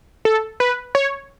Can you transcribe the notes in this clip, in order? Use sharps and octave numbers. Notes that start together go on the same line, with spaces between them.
A4
B4
C#5